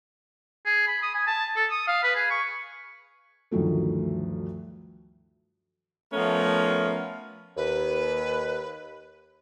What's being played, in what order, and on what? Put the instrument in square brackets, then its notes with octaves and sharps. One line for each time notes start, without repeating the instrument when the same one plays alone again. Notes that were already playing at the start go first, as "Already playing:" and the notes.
[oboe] G#4
B5
D#6
G#5
A5
A4
D#6
F5
B4
G#4
C#6
[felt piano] D2 G2 D#3 F3 F#3 A3
[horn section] F3 A3 B3 C#4 A#4
[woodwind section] D#2 [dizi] B4